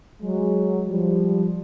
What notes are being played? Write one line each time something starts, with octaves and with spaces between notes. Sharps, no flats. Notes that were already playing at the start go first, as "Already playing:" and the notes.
F#3 G#3
F3 G3